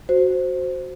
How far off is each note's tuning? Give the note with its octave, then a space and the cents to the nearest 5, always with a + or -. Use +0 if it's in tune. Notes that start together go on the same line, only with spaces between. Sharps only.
F#4 +0 C5 +0